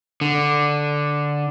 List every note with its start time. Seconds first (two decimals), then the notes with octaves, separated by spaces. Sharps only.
0.21 D3